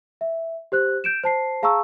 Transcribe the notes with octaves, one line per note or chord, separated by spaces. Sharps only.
E5
G4 C5 F#6
G6 D7 E7
C5 A5 C7
G#4 F5 A5 A#5 C#6 E6